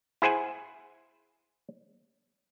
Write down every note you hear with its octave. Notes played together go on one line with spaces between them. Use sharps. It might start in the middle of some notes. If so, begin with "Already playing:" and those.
E4 G#4 C5 F#5 G#5